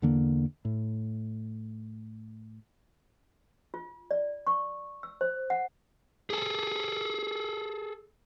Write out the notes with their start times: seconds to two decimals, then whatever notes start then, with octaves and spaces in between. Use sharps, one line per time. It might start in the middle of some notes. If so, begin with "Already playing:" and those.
0.02 E2 D3 A#3
0.65 A2
3.74 F4
4.11 D5
4.47 C#6
5.03 E6
5.21 C5
5.50 F#5
6.30 G#4 A4